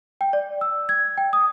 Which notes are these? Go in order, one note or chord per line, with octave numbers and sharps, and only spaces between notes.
G5
D5
E6
G#6
G5
D#6